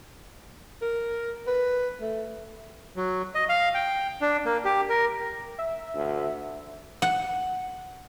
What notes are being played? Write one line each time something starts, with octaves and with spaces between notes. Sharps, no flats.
A#4
B4
A3
F#3
D#5
F5
G5
D4
A#3
G4
A#4
E5
D2
F#5